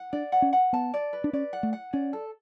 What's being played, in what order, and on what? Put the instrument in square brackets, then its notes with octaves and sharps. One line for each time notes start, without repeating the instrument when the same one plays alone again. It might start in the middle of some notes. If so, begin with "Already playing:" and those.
Already playing: [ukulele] F#5
[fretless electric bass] D4 [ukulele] D5
[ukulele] F#5
[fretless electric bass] C#4
[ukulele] F#5
[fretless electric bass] B3 [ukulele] A5
[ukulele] D5
B4
[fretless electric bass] D4
[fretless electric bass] C#4 [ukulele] D5
[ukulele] F#5
[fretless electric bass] A3
[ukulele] F#5
[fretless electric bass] C#4 [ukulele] D5
[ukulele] A4